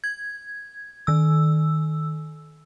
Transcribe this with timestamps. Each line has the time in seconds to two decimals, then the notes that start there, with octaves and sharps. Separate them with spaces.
0.04 G#6
1.07 D#3 E6